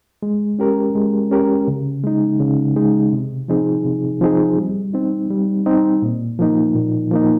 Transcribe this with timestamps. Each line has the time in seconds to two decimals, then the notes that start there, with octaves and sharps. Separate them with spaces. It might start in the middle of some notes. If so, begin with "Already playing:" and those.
0.23 G#3
0.59 C#4 G4 A#4
0.95 G#3
1.31 C#4 G4 A#4
1.68 C#3
2.04 G#3 D#4
2.40 C#3
2.76 G#3 D#4
3.13 C3
3.48 F3 C4 D#4 G#4
3.85 C3
4.21 F3 C4 D#4 G#4
4.58 G3
4.94 C4 D#4
5.30 G3
5.66 C4 D#4
6.02 A#2
6.39 F3 A#3 D#4
6.75 A#2
7.11 F3 A#3 D#4